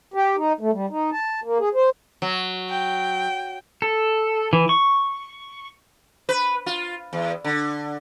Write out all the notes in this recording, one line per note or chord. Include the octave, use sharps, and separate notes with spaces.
G4
D#4
A3
G3
D#4
A5
A#3
G#4
C5
F#3
G5
A4
E3
C#6
B4
F4
E2
D3